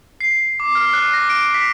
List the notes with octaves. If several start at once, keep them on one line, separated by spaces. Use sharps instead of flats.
C7
D6
F6
F#6
A#6
D7
B6